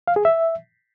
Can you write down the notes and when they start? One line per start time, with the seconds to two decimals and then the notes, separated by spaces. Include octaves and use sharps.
0.08 F5
0.16 G#4
0.25 E5